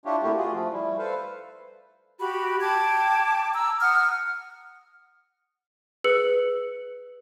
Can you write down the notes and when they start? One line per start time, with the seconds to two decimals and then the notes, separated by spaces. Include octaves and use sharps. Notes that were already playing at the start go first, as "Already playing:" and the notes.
0.05 D4 E4 F4 G4 C#5
0.23 C3 A3 A#3 E4 F#4 G4
0.37 F4 F#4 G#4
0.53 F3 A3
0.72 G3 E4
0.98 A4 B4 C5 F5
2.18 F#4 G4 B5
2.61 G5 A5 D6 G#6
3.53 A#5 E6
3.80 F#5 D#6 F6
6.04 G#4 B4 E6 C#7 F#7